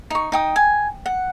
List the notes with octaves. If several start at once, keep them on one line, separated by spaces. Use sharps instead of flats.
D#4 C#6
D#4 G5 D#6
G#5
F#5